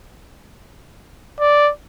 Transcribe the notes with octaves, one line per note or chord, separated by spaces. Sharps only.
D5